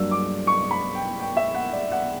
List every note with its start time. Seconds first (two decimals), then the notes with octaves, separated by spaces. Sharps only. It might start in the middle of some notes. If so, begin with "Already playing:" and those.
Already playing: G2 F#3 A#3 D4 E6
0.11 D6
0.47 C#6
0.71 B5
0.95 G5
1.20 G5
1.37 E5
1.55 F#5
1.73 D5
1.92 F#5